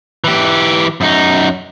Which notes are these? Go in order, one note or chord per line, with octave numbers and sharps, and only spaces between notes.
E3 G4
F#2 D#4